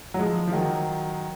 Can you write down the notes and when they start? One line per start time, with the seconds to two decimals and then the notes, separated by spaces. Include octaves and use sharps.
0.14 F#3
0.19 F3 G#3
0.47 F3
0.52 D#3 F#3